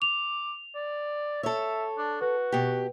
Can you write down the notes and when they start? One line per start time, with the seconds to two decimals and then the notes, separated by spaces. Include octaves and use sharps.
0.02 D6 F7
0.75 D5
1.43 A4 C#5 E5
1.98 D4
2.21 F#4 B4
2.52 B2 G4